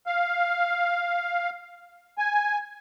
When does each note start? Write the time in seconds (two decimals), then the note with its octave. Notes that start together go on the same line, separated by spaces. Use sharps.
0.06 F5
2.18 G#5